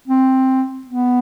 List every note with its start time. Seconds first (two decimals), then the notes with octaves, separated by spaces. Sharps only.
0.08 C4
0.87 B3